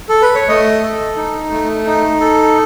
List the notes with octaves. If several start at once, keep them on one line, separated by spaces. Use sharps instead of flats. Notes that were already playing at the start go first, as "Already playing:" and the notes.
A4
B4
C#5
A3 D#5
A4
D#4
A3
D#4
A4